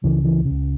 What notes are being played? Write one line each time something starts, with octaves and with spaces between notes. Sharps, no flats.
C#2 C#3 E3
E3
C#3
C#2